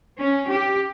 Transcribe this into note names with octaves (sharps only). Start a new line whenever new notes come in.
C#4
G4